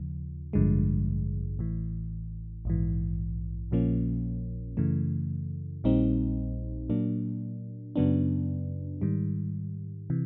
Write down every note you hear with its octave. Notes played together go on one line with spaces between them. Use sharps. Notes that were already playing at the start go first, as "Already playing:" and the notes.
Already playing: D#2 C#3 F3
A1 G2 D3 F3 G#3
A1 A2 E3
A#1 G#2 E3
A#1 A#2 F3 A#3 C#4
F#2 C#3 E3 A3
A#1 A#2 G3 C4 D#4
A#2 F#3 A#3 D4
F#2 C#3 F#3 B3 D4
G#2 D#3 G3
C3 E3